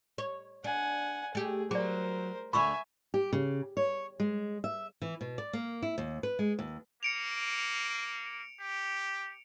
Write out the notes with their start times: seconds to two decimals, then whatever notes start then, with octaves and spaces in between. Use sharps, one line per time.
0.18 C#5
0.64 D4 F#5 G#5
1.35 A3 G4 G#4
1.71 F#3 G#4 A#4 C5 D5
2.53 D2 D3 E5 G#5 B5 C#6 E6
3.14 G4
3.33 C#3
3.77 C#5
4.20 G#3
4.64 E5
5.02 E3
5.21 B2
5.38 D5
5.53 A#3
5.82 E4
5.98 D#2
6.23 B4
6.39 G#3
6.59 D#2
7.03 A#3 C#7 D7 F7
8.60 G4